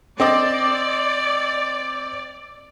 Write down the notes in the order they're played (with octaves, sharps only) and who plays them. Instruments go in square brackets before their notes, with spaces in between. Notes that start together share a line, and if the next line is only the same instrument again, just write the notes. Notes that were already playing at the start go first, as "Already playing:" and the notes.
[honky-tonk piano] C4 D#5 D6 [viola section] D5